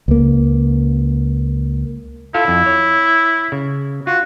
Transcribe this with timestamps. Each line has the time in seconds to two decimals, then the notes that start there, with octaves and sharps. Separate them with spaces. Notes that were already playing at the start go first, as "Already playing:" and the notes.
0.08 C#2 A#3
2.34 E4 F4 A4 F5
2.48 F2
2.66 C#5
3.52 C#3
4.07 F4 F#4